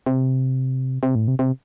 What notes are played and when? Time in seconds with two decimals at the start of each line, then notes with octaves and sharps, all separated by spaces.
0.06 C3
1.03 C3
1.15 A2
1.28 C3
1.39 C3